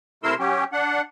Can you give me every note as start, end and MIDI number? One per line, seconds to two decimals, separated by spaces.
0.23 0.35 48
0.23 0.35 57
0.23 0.35 64
0.23 0.35 70
0.23 0.35 84
0.23 0.35 88
0.39 0.64 54
0.39 0.64 61
0.39 0.64 67
0.73 1.01 62
0.73 1.01 78